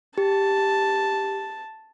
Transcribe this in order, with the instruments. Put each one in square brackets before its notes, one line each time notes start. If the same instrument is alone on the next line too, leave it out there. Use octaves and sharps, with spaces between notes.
[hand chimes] G4 [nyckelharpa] A5